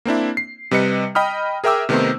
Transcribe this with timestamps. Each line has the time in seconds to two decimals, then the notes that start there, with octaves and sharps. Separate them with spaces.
0.05 A#3 C4 D4 E4
0.37 C7
0.71 C3 G3 B4 D#5 C#7
1.15 D#5 G5 B5 D#6 F6
1.64 G#4 A#4 E5 G5 D6 E6
1.89 C3 D#3 A3 B3 D#4 C5